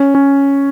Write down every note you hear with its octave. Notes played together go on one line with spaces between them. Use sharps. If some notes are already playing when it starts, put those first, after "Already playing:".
Already playing: C#4
C#4